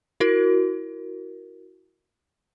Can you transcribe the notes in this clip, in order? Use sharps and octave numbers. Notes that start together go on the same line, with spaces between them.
E4 F#4 A#4